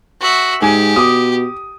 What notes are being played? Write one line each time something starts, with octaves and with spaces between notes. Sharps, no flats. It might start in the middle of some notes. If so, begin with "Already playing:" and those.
F#4 E5
G#2 G4 G#4 G#5
B2 D6 D#6